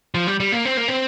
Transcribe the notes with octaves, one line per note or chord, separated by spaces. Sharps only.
F3
G3
G3
A#3
C4
A#3
C4